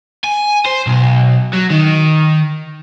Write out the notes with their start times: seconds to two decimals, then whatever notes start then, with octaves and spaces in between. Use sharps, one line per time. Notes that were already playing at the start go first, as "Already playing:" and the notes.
0.24 G#5
0.66 C5
0.87 B1
1.53 F#3
1.70 D#3